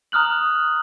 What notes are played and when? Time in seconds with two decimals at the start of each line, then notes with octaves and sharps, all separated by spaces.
0.12 A#5 D#6 F6 F#6 F#7